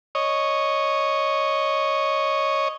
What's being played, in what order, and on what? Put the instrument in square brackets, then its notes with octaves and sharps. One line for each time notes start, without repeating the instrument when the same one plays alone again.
[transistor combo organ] C#5 D#5